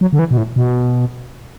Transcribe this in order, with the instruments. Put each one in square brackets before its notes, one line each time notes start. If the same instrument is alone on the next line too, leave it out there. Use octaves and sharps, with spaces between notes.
[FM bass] F#3
D3
E3
B2
A2
B2